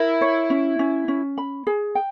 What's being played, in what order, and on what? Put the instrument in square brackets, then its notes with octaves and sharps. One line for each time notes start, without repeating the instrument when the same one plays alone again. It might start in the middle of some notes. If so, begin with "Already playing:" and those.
Already playing: [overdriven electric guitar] E4 [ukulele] A#4
[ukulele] C#5
C#4
C#4
C#4
B5
G#4
G5